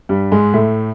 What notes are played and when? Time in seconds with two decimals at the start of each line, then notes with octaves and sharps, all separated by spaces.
0.09 G2 G3
0.32 G#2 G#3
0.53 A2 A3